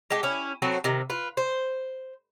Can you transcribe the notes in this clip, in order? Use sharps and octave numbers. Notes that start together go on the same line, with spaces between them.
G#3 A3 G4
C#4 E4
F#3 A3 B3 C4
C3 D#3
F4 B4
C5